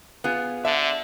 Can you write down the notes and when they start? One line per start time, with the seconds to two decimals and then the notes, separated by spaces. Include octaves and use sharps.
0.24 B3 F4 G#4
0.65 D3 E5